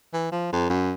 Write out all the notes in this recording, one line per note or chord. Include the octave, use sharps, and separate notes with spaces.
E3
F3
F2
F#2